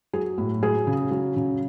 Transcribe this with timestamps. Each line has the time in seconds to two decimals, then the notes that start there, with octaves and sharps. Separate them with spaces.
0.13 F#3 G#4
0.38 A2
0.62 F#3 G#4
0.87 C#3
1.11 F#3
1.36 C#3